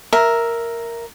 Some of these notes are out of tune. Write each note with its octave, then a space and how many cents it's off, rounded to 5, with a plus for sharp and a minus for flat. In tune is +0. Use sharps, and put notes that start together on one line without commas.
A#4 +0 E5 +0